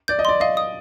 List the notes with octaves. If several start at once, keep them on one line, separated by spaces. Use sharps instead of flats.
D5 G6
D#5
D5 C6
D#5 F5
D#6